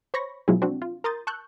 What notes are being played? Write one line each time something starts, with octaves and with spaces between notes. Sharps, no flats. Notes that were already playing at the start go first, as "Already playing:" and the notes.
C5 C#5 B5 C#6 A#6
B2 F3 F#3 G#3 E4 G#4
C4 D4 F#4
F4
A#4 A#5 C6 D#6 G6 A6
A5 C#6 E6 F#6 G6